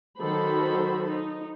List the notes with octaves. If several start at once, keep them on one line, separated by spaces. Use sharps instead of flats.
D#3 F#3 F#4 A4 C5 B5
D#4